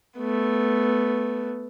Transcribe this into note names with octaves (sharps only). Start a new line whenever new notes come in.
A3 B3